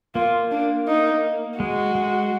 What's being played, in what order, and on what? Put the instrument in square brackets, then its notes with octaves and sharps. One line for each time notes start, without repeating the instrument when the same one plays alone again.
[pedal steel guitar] A#3 [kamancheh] F4
[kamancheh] D4
D#4
[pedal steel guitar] G#3 [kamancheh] F#4
[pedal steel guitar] G#3